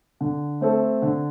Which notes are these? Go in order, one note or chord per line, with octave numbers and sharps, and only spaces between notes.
D3
A3 C4 A4
D3